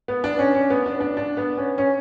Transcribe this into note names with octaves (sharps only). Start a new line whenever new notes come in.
B3
D4
C#4
C#4
B3
D4
D4
D4
B3
C#4
C#4